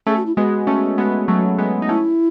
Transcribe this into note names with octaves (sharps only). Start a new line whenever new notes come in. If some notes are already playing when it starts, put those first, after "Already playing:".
A3 C#4 G#4
F#4
E4
G#3 B3 F#4
A3 C#4
G#3 B3
F#3 A3
G#3 B3
D#4
A3 C#4 E4